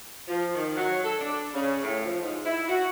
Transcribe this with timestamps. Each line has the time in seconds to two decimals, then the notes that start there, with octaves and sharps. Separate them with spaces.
0.28 F3
0.54 D#3
0.75 F#3
1.04 A4
1.19 D4
1.54 C#3
1.81 A2
2.04 F3
2.21 G#2
2.45 E4
2.68 F#4